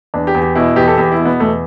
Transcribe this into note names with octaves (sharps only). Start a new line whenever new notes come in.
E2 D4
G4
E2
G4
B2 E4
E2 G4
A4
E2 G4
E4
B2
B3
E2 A3